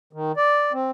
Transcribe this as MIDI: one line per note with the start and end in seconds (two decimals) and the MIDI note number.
0.13 0.32 51
0.37 0.72 74
0.72 0.91 60